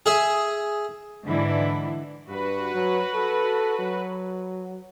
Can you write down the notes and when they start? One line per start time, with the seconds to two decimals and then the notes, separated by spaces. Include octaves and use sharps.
0.06 G#4 E5
1.26 G#2 D3 E3 D4 E4
2.29 G2 F#4 B4
2.75 F#3
3.14 A4
3.79 F#3